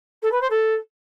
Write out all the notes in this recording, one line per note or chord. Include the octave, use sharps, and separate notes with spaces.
A4
B4
C5
A4